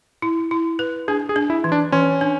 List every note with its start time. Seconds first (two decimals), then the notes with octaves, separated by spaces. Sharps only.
0.22 E4
0.51 E4
0.79 B4
1.08 D4 G#4
1.29 G#4
1.36 D4
1.50 E4
1.64 E3
1.72 D4
1.92 E3 C#4
2.21 D4